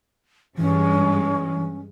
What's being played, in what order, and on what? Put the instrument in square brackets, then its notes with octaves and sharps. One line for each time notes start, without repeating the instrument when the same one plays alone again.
[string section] G2 G#3 [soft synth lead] E3 [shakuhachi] C#4